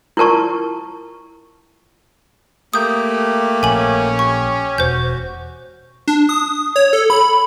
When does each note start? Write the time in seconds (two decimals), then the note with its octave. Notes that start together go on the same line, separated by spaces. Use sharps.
0.17 E4 F4 A#4 A5 C#6
2.73 A3 A#3 G4 D#6 G6
3.63 A#1 C#4 G#5 F#7
4.19 G4 C#6
4.78 E1 F#4 C5 G6
6.08 D4
6.29 D#6
6.76 C#5
6.93 A4
7.10 B5